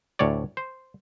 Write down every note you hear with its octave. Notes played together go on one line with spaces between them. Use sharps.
D2 A2 C#5 D5
C5